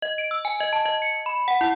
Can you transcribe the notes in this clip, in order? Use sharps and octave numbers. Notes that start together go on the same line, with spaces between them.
D#5
D7
E6
G#5
D#5
A5
D#5
C#7
B5
F#5
E4